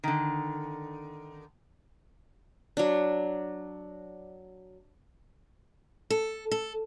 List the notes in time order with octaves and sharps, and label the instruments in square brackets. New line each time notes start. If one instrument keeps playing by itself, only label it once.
[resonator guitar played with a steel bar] D3 D#3
[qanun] F#3 D4
[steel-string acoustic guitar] A4
A4